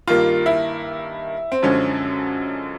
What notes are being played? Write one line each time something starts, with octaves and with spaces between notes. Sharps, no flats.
G2 D#3 G3 A#3 F4
E4
C4
F#2 D3 F3 G#3 C#4